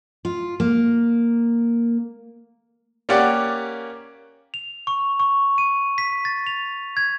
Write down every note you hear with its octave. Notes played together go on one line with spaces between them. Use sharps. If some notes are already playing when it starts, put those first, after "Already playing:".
F4
A#3
A#3 C#4 G4 D5 F#5
F7
C#6
C#6
D#7
B6
A6
F7
G#6